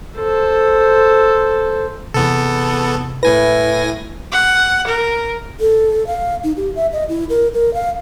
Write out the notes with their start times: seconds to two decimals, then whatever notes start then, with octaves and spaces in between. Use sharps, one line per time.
0.17 A4 C5
2.14 E2 C3 B3 A4
3.23 A2 E4 B4 G#5 A#6
4.32 F#5
4.87 A#4
5.60 A4
6.07 F5
6.44 D#4
6.57 G4
6.76 E5
6.93 D#5
7.09 E4
7.29 A#4
7.54 A#4
7.74 F5